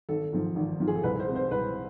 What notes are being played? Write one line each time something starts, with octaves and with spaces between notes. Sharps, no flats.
G#1 A4
G#2 F3
G#1
G#2 F3
G#4
A4
C2 B4
C5
C3 G#3
C5
C2 B4